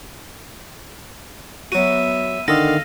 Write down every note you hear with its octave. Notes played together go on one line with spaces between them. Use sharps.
F#3 B3 F#4 E5 D#7
D3 D#3 A4 D#5 F5 A#6